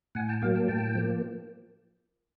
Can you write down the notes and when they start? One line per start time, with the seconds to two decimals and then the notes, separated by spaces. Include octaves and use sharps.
0.15 A2 F#5 G#5
0.28 G5 A5
0.42 F#3 A#3 F5 G5
0.55 G5 A5
0.68 A2 G5 A5
0.95 F3 A#3